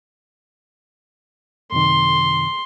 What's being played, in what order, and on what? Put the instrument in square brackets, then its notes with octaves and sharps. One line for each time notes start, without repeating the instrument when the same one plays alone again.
[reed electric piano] F#2 C3 D#3 [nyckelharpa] C6